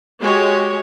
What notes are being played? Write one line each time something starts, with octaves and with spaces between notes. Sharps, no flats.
G#3 F#4 G4 C#5